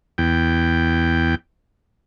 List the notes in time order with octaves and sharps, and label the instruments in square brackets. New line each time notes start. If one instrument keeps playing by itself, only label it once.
[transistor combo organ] E2 G5